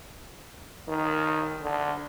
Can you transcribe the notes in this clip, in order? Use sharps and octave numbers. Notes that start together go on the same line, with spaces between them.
D#3
D3